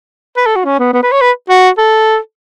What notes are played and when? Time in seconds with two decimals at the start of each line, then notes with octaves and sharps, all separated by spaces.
0.37 B4
0.46 A4
0.56 F#4
0.65 C#4
0.79 B3
0.93 B3
1.03 B4
1.12 C#5
1.21 B4
1.50 F#4
1.78 A4